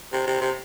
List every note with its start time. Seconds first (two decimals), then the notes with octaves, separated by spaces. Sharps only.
0.12 C3
0.27 C3
0.41 C3